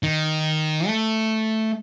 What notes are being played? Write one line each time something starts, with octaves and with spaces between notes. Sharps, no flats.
D#3
A3